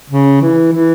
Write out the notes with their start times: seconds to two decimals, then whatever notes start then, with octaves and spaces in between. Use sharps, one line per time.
0.10 C#3
0.41 E3
0.72 E3